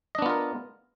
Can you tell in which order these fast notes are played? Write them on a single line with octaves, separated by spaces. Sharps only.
D#5 D4 B3 F4 A#4